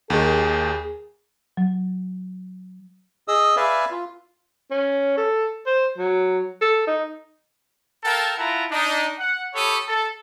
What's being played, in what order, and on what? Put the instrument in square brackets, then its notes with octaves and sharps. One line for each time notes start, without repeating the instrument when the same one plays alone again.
[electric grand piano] D#2 D#3 [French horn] G#4
[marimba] F#3
[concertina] G#4 D#5 D#6 E6
B4 D5 E5 F5 G#5
F4
[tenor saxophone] C#4
A4
C5
F#3
A4
D#4
[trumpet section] A4 A#4 F5 G5 A5
E4 F4 F#5 A5 A#5
D4 D#4
F#5
G4 A4 C#5 B5 D#6
A4